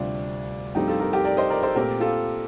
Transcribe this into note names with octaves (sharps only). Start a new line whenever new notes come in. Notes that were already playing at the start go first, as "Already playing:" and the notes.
Already playing: D2 C3 G3 C4 D4 F4
G2 F3 A3 C4 D#4 G4
F4 A4
G4 A#4
G4 A#4
A#4 D5
C5 D#5
A#4 D5
A4 C5
A#2 A3 C4 G4 A#4
F4 A4